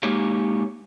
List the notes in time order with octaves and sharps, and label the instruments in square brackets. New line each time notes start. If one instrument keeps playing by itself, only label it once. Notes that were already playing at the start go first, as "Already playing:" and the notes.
[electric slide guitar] G#3 A#3 D#4 G4 C#5 F5